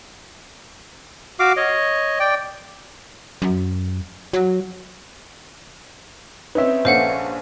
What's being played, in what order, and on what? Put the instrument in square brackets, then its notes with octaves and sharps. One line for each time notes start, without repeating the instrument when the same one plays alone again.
[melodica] F#4 F5 D6
C#5 D#5
D5 G5
[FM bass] F#2
F#3
[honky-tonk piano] C4 C#4 D#4 [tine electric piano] B4 E5
[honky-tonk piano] A#1 C#4 A4 [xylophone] C5 F5 F#5